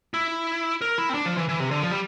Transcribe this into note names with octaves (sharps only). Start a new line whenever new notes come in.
E4
A#4
E4
C4
D4
F3
E3
E3
C3
D3
F3
G3